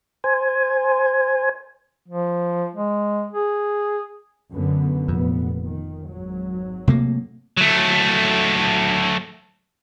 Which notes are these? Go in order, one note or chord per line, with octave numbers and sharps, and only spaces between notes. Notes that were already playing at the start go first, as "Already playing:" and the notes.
C5 G#5
F3
G#3
G#4
F#2 D3 B3
F1 F2 A#2 B3
D#3
G#1 F#3
C3 A3 A#3
F#3 A3